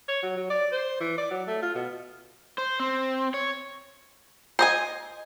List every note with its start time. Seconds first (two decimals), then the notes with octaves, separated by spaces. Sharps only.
0.08 C#5
0.22 F#3
0.37 F#3
0.50 D5
0.72 C5
1.00 E3
1.18 D5
1.31 F#3
1.47 A3
1.62 F4
1.75 B2
2.58 C5
2.80 C4
3.34 C#5
4.59 C5 D#5 G#5